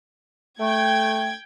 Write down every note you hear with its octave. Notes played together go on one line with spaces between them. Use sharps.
A3 G5 G#6